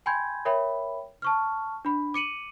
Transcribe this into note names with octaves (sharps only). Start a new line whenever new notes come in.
G5 G#5 B5 C6 G6 G#6
A#4 C#5 E5 G5 B5
A5 C#6 F6
D4 B5
D6 C#7 D#7 F#7